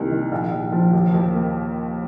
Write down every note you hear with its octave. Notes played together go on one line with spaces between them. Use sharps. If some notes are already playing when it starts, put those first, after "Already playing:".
Already playing: C2 D#3 A#3
D#3
A#1
A#1
F3
D#2
D#2
A#3